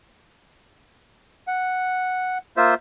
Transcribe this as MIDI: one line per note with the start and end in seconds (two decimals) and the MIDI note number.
1.47 2.38 78
2.57 2.74 58
2.57 2.74 65
2.57 2.74 72
2.57 2.74 76